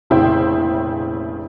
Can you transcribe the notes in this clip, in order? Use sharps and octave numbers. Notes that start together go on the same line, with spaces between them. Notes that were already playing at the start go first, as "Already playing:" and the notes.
F1 A#1 C#3 E4 C5 G5